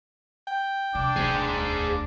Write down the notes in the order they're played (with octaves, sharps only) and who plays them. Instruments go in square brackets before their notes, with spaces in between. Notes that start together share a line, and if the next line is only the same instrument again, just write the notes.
[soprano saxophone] G5
[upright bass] C3 [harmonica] D4 D6
[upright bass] E1 D2 [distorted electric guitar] G#4 C5